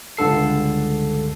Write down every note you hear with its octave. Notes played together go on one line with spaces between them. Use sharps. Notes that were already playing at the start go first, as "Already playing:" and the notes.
C#2 G2 D3 A4 C7